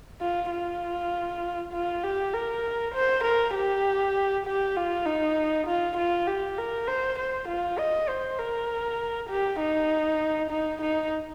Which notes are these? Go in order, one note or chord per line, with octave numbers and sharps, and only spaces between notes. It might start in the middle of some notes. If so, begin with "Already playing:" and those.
F4
F4
F4
G4
A#4
C5
A#4
G4
G4
F4
D#4
F4
F4
G4
A#4
C5
C5
F4
D#5
C5
A#4
G4
D#4
D#4
D#4